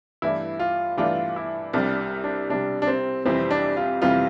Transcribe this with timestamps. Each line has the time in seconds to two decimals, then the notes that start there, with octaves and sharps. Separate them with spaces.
0.22 G2 E3 A3 D4 E4
0.59 F4
0.97 G2 E3 A3 D4 F4
1.36 E4
1.73 C2 C3 G3 D4
2.24 D4
2.49 C2 C3 G3 D4
2.82 D4
2.87 C4
3.25 F2 C3 E3 G3 C4
3.51 D4
3.77 F4
4.02 F2 C3 E3 G3 F4